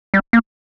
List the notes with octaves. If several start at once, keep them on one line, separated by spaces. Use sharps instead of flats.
G3
A#3